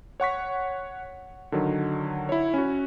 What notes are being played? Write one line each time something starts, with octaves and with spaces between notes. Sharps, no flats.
C#5 F#5 C#6 B6
D3 D#3 F#3
E4 C#5
C#4 F#4